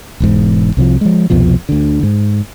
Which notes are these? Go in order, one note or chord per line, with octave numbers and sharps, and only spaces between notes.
E1 E2 G#2
C2 C3 F3
F3 G#3
C2 F2 B2 F3
D2 D3
G#2